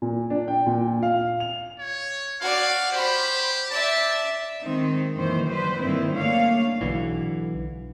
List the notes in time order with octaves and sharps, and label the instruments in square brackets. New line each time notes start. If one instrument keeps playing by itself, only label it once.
[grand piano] A#2
D4
G5
A#2
F5
F7
[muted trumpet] C#5
[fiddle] F#4 D5 [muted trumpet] F5
[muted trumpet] G4 [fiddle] C5 B5
[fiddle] D5 E5 [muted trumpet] A5
[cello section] D#3 G#3 C4 D#4
F#2 A#2 D#3 E3 C5
F#3 G3 B4 C5
G2 A#2 D3 D#3 C4 E4
C#3 A3 A#3 D4 C#5 F5
[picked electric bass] B1 D3 E3